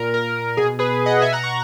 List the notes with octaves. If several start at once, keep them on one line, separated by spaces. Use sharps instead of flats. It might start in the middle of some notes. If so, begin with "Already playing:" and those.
Already playing: A#2 A#4
A#4
B2 G#4
G#4 B4
D#5 F#5
B2 E5 G#5
F#5 A#5
A#5 C#6